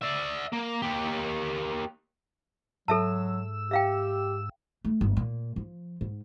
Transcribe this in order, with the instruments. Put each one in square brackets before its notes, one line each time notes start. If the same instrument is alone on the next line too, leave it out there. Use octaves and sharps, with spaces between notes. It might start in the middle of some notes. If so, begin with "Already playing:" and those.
[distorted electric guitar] D5 E5
A#3
A#3 G4
[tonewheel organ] G#2 E6 [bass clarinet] F#3 [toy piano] A4 E5 A5
[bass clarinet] G4 [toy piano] E5 F5 G5
[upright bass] A3
G1
A#2
F3
G#2